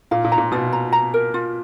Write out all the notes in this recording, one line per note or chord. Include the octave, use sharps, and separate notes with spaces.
A#2 F5
A#2
A#5
A#2
B2 F4
A#5
A#5
A#4
F4